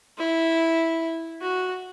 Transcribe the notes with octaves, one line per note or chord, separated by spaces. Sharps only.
E4
F#4